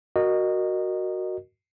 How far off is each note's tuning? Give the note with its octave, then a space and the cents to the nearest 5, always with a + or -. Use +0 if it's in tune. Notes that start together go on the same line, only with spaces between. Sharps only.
F#4 +0 A#4 +0 D#5 -20